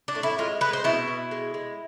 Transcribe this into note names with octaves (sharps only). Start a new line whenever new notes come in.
D4
A2
E4
G#3 F4
G#3 B4
C5
B2 E4
B2
G#3
G#3